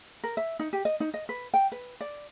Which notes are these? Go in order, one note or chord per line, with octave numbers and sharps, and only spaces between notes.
A#4
E5
D#4
G4
D#5
D#4
D#5
B4
G5
B4
D5